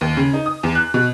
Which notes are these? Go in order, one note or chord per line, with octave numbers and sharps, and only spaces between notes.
D#2
C#3
D#4
D#6
E2
F#6
B2